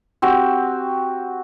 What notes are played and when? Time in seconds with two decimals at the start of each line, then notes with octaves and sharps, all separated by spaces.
0.22 C4 F#4 G4